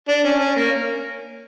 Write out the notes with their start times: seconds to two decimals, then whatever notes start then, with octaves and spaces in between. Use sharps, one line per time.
0.08 D4
0.24 C#4
0.39 C#4
0.56 A#3